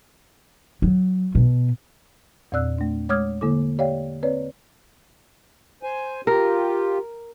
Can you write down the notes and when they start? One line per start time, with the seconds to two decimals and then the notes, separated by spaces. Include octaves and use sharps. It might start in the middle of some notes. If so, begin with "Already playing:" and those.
0.82 F#3
1.35 B2
2.52 E2 A#2 C4 D5 E6 F#6
2.78 A3 D4
3.09 G#3 C#5 D6 D#6 F6 G#6
3.41 D3 A#3 E4 A4 D6
3.78 G4 C#5 D5 F5 G5
4.23 C4 B4 C#5 D5
5.83 C5 G#5
6.27 F4 G4 A#4